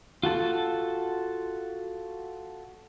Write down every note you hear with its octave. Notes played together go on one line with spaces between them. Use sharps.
F4 F#4 A4